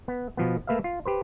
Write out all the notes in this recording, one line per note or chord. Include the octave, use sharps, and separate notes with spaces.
B3
B2 F3 B3
A3 A#3 B4 E5 F5
F4
G4 B4 C5